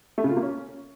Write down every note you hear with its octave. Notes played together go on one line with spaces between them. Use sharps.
A3
C#3
F4
A#3
C#4